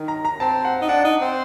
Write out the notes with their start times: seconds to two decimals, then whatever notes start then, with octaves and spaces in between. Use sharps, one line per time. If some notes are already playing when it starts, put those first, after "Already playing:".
Already playing: D#3
0.08 A#5
0.25 A#5
0.40 C4 A5
0.65 F#5
0.81 D#4
0.88 D4 F#5
1.04 D#4
1.21 C4